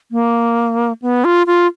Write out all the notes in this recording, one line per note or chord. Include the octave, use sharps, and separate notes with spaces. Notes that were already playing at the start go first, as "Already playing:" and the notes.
A#3
B3
F4
F4